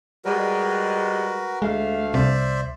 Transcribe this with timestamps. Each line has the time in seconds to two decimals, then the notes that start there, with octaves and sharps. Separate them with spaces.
0.25 G3 G#3 F#4 A#4 B4
1.62 D2 G#3 A3 F5
2.14 C2 C5 D5 E5